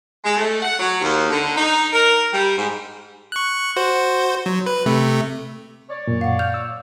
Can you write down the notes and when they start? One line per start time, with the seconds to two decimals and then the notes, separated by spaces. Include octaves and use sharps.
0.23 G#3
0.36 A3
0.62 F#5
0.79 F#3
1.01 D#2
1.28 D3
1.54 D#4
1.91 A#4
2.33 G3
2.55 G#2
3.32 C#6 F#6
3.76 F#4 C5
4.46 F#3
4.66 B4
4.86 C3 A3
5.88 C#5 D5
6.07 F#2 A#2
6.21 F5 F#5
6.39 F5 F6 G6 F7
6.54 E6